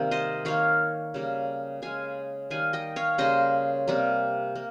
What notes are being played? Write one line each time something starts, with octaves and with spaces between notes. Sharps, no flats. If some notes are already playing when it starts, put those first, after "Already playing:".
Already playing: C3 D#3 G3 A#3 A#4
C5 D#5
D#3 A#3 C#5 F5
C#3 G3 A#3
C#3 G#3 F5 G#5
D#3 G3 A#3 F5 G#5
D#5 G5
C#5 F5
C#3 G3 A#3 C5 D#5
C3 G3 A#3
A#3